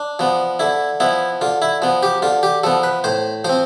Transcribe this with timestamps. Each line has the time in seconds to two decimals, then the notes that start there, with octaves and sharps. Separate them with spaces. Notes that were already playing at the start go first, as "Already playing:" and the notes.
Already playing: D4
0.19 F3 B3
0.60 D3 E4
1.00 F3 B3 E4
1.41 D3 F4
1.62 E4
1.82 F3 B3
2.03 G4
2.22 D3 F4
2.43 G4
2.64 F3 B3 A4
2.83 B4
3.04 A2 C5
3.45 F3 C4 C5